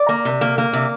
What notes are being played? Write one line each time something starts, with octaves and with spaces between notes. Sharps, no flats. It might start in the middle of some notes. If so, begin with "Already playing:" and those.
Already playing: D5
A#3
C3
A#3
A#3
C3